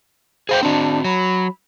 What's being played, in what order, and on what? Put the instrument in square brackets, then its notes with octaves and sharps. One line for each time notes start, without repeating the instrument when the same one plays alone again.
[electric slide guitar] G#4 F5 G5 [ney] C5
[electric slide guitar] C4 F#4 [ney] D4
[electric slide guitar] F#3 [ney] B5